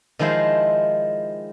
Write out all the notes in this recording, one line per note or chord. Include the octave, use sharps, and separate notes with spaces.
D#3 F3 G#3 E4 C5